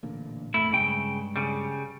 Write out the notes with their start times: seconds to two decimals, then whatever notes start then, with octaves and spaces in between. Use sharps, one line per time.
0.03 A1 A#2 D3
0.54 G#1 F2 A3 E4
0.73 G2 C#3 G#3 G5
1.36 C#3 G3